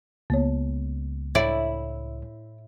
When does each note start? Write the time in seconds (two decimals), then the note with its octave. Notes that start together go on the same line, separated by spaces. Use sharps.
0.30 C#2 A#3 B3 C#5
1.35 A2 E4 D5